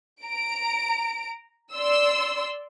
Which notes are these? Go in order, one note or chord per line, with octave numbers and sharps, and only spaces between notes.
A#5 D7
D5 C6 E6